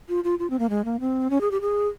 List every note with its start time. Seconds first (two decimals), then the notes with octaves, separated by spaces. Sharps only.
0.09 F4
0.24 F4
0.39 F4
0.50 C4
0.59 A#3
0.70 G#3
0.85 A#3
1.00 C4
1.30 C#4
1.41 G#4
1.51 G4
1.61 G#4